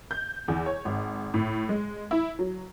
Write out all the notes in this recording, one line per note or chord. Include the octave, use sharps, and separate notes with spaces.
G6
E2
C#5
G#1
A2
G#3
E4
F#3